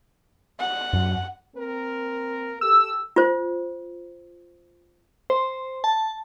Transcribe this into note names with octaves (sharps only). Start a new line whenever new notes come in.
F#5
F#2
A#3 C4 A#4
G4 A4 E6
F4 C5
C5
A5